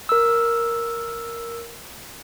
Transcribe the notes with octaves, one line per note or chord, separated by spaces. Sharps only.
A#4 E6